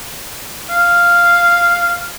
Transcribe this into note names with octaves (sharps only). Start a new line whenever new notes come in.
F5